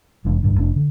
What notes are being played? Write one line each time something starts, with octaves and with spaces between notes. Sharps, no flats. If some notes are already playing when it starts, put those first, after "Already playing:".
F1 E2 G#3 D4
B1 G2 D3
F1 A3 D4
D3